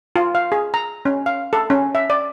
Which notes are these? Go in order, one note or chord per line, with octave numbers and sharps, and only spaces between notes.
F4
F5
G#4
A#5
C#4
F5
A4
C#4
E5
D5